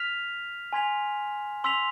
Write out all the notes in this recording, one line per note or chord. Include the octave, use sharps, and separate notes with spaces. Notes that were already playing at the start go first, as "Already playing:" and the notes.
Already playing: F6 B6 F7
G#5 C6 G#6 B6 F7
C6 E6 B6 F7